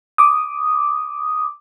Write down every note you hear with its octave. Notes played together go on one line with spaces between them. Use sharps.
D6 D#6